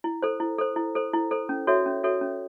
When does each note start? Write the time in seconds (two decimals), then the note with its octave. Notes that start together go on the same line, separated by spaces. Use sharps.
0.04 E4
0.22 A4 C5
0.40 E4
0.58 A4 C5
0.76 E4
0.95 A4 C5
1.14 E4
1.31 A4 C5
1.49 C#4
1.67 F#4 A4 C#5 E5
1.86 C#4
2.04 F#4 A4 C#5 E5
2.21 C#4